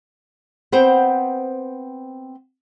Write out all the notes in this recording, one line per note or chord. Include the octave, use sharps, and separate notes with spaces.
B3 C4 C5 G5